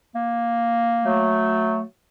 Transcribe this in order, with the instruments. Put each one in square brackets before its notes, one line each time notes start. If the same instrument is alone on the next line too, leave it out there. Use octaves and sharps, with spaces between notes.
[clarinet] A#3
[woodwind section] F#3 A3